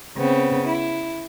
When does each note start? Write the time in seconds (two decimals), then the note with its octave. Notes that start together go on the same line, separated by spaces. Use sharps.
0.17 C#3 B3 C4
0.65 E4